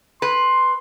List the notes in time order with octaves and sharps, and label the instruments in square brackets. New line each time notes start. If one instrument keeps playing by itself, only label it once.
[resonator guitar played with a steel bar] B4 [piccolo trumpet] C6